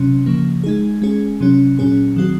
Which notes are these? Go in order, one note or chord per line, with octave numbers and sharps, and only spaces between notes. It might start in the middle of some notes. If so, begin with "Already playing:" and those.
Already playing: C3 F#3 C#4
C#3 F3 A#3
G#3 D#4 G#4
G#3 C#4 G#4
C3 F#3 C#4
A#2 F#3 C#4 G#4
D#3 F#3 C4 F#4